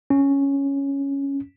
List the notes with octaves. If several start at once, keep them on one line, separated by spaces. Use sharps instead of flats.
C#4